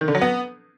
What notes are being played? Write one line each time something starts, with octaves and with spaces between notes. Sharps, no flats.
D#3
D3
F#3
B3